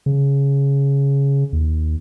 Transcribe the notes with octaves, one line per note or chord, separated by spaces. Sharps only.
C#3
D#2